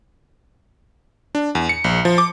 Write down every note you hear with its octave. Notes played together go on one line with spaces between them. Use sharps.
D4
E2
C#7
A#1
F3
D6